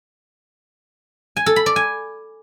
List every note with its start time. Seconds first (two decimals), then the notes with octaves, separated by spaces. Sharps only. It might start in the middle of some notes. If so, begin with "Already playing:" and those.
1.37 G#5
1.46 A4
1.56 B5
1.66 D5
1.76 G#5